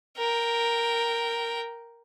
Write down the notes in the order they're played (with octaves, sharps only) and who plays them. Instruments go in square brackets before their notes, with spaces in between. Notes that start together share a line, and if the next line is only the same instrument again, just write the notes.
[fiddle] A#4 G5